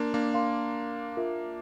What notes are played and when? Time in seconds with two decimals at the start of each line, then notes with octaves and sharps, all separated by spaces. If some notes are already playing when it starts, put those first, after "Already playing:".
Already playing: A#3 D4 A#4 F5 C6
0.14 A#3 D4
0.34 A#4 F5 C6
1.17 F4 A#4 E5